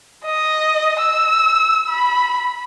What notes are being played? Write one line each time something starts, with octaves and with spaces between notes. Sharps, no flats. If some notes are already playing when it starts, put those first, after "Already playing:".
D#5
E6
B5